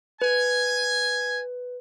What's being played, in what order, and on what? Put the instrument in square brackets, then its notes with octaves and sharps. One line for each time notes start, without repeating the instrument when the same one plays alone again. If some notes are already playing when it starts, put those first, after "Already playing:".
[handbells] B4 [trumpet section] G#5